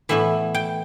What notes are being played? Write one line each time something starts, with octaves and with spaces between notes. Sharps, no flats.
A2 E3 B3 E4 E5
G5